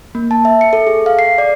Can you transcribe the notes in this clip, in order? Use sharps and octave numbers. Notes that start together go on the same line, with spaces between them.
A#3
A5
E5
C#7
A4
G#4
F5
C7
D5